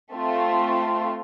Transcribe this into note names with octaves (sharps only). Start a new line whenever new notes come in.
A3 C4 F4